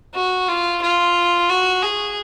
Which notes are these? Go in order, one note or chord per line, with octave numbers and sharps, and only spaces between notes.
F#4
F4
F4
F#4
G#4